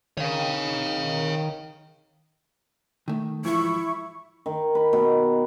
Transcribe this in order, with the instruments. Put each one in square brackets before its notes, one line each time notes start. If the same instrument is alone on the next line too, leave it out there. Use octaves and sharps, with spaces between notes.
[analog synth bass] D#3 [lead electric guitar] C#5 F5
[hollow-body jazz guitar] D#3 A3
[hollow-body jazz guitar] G#2 E3 F3 [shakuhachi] E4 [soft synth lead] C#6
[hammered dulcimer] D#3
B4
B2